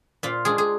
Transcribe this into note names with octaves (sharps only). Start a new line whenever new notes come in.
A#2 F4
G#3 D4 G#4
G#4